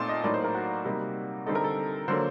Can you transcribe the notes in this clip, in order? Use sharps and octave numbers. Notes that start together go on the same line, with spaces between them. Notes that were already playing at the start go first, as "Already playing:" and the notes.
Already playing: A#2 A3 C4 D#4 A5 C6
D#5
A2 F#3 A#3 D#4 D5
C5
A#4
F#4
C3 G3 A#3 D#4
D3 G3 C4 D#4 A4
A#4
A4
D3 F#3 A#3 C5